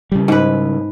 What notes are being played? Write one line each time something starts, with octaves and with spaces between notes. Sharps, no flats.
C#3 G3
G#2 B4